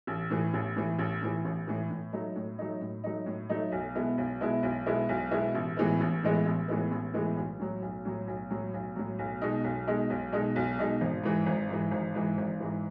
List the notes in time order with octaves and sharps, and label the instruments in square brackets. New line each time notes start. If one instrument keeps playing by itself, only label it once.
[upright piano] A1
A2 E3
A1
A2 E3
A1
A2 E3
A1
A2 E3
A2
F#3 A3 D#4
A2
F#3 A3 D#4
A2
F#3 A3 D#4
A2
F#3 A3 D#4
B1
B2 G#3 B3 E4
B1
B2 G#3 B3 E4
B1
B2 G#3 B3 E4
B1
B2 G#3 B3 E4
A1
A2 E3 G#3 B3
A1
A2 E3 G#3 B3
A1
A2 E3 G#3 B3
A1
A2 E3 G#3 B3
B1
A2 F#3
B1
A2 F#3
B1
A2 F#3
B1
A2 F#3
B1
B2 G#3 D#4
B1
B2 G#3 D#4
B1
B2 G#3 D#4
B1
B2 G#3 D#4
G#1
G#2 E3
G#1
G#2 E3
G#1
G#2 E3
G#1
G#2 E3